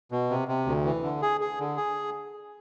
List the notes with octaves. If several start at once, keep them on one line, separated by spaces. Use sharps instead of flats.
B2
C3
C3
D2
E3
D3
G#4
G#4
D3
G#4